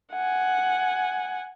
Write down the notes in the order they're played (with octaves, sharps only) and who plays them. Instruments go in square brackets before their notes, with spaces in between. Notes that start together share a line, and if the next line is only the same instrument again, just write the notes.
[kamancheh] F#5 G#5